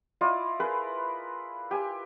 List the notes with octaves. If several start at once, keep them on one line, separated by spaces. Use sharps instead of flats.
E4 F4 D5 D#5
G#4 A#4 B4
G4 G#5